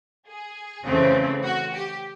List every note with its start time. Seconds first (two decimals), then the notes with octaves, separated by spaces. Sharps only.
0.28 G#4
0.86 F2 C#3 E3 A3 C4
1.44 F#4
1.73 G4